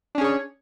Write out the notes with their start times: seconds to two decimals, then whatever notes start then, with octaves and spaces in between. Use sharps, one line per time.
0.15 D4
0.18 C#4
0.21 G#4
0.24 C#5